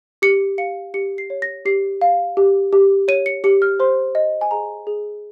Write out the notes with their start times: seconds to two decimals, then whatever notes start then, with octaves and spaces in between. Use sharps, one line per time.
0.22 G4 C#7
0.58 F5 C#7
0.94 G4 C#7
1.18 C7
1.30 C#5
1.42 A#6
1.65 G4 C7
2.01 F5
2.37 G4
2.73 G4
3.08 C#5 D#7
3.26 C#7
3.44 G4 C#7
3.62 F6
3.80 C5 C6
4.15 D#5
4.41 G#5
4.51 G#4 A#5
4.87 G#4